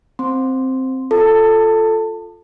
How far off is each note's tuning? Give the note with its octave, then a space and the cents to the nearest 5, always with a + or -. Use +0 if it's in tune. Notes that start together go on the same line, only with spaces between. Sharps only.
C4 +0 C6 +0
F4 +0 A4 +0 A5 +25